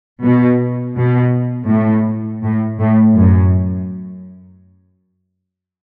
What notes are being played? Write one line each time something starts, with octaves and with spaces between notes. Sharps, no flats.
B2
B2
A2
A2
A2
F#2